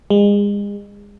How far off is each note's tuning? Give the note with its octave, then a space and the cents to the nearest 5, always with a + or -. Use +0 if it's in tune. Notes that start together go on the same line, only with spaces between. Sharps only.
G#3 -35